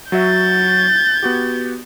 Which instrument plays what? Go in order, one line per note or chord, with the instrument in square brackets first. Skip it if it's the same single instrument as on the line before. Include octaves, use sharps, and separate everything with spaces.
[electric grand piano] F#3 F#4 E5 [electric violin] G6 A6
[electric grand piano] B3 F#4 G4